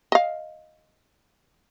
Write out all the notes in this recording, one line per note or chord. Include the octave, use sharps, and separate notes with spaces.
D#5 F5